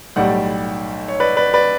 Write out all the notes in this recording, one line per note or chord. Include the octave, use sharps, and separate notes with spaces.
B1 A2 G3 D5 F#5
C#5
B4 D5
B4 D5
B4 D5